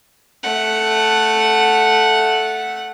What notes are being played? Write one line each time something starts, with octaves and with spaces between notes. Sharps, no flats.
A3 F#5